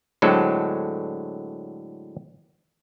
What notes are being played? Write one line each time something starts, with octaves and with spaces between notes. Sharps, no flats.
A2 D3 F#3 G#3 C4 A4